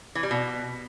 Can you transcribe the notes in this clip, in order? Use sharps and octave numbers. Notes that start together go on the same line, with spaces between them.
E3
G3
B2